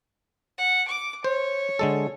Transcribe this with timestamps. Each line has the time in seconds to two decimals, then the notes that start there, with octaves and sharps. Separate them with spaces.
0.58 F#5
0.88 D6
1.24 C5 C#5
1.79 D3 G#3 A4